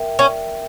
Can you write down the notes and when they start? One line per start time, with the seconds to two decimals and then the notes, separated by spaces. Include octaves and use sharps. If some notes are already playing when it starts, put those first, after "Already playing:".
Already playing: A#4 E5 G5
0.19 C#4